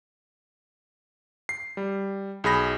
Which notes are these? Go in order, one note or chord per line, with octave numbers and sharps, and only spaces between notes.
C7
G3
B1 G#4 B5 A#6